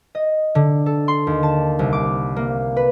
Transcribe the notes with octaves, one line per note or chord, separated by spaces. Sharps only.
D#5
D3
A4
C6
D#2
A5
C2
D6
A#3
B4